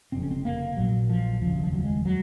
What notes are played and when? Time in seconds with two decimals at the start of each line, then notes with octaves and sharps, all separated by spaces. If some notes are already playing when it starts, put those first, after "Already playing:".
0.12 F#1 F2 C3 C4
0.23 C#4
0.31 C4
0.45 A#3
0.77 A#1 A#2 F#3
1.10 F3
1.41 F1 D#2 C#3 F3
1.56 F#3
1.64 F3
1.73 F#3
1.84 G#3
2.05 F#3